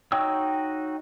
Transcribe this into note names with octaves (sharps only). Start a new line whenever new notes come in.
D#4 F#4 C#5 G5 E6